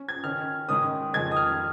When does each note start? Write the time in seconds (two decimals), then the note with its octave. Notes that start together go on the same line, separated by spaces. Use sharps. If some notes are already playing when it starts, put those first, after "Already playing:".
Already playing: C#4
0.09 G#6
0.24 D#3 C#4 F6
0.68 G#2 D#3 C#4 D#6
1.13 F2 D#3 G#3 G#6
1.31 D#6
1.37 F6